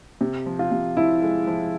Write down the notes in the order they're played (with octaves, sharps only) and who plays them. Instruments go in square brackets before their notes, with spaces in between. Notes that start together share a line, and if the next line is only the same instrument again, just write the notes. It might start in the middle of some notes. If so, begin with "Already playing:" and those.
[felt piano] C3
F3
[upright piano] F4
[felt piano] C3
[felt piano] F3 [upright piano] E4
[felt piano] G#3
F3